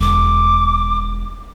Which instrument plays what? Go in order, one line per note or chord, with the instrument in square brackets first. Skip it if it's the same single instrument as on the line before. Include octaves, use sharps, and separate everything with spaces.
[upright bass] E1 [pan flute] D6